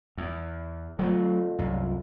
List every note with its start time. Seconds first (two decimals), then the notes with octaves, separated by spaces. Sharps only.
0.18 E2
0.99 F2 D3 F#3 G3 A3
1.59 C2 F#2